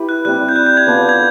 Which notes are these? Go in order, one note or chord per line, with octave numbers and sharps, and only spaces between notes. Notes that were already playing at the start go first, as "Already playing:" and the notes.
Already playing: E4 G4 B4
F#6
G3 C4 E4 F#6
G6
F#6
G6
G#6
B3 D4 F4 A4
G#6